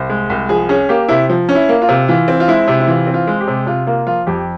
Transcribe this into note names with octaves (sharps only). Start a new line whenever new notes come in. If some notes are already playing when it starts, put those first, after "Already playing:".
Already playing: C2 C5
G#3
C2
F3 G#4
C#4 G#4
A#3 G4
C3 E4
F3
C#4
E4
A#3
F4
C3
E3 F4
C4
F4
G#3 E4
C3
E4
E3 F4
C4
F4
G#3
G4
C3
C3 F4
A#3 F4
F3 F4
F2 G4